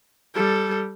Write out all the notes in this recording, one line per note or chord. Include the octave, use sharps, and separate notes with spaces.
G3 A4